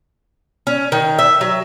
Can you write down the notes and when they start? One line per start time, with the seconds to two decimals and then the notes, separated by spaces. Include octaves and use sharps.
0.67 C#4
0.92 D#3
1.19 E5
1.41 F#3